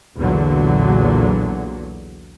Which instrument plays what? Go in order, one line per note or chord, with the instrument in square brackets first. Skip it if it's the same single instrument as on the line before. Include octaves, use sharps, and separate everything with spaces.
[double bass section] B1 E2 A#2 D3 F#3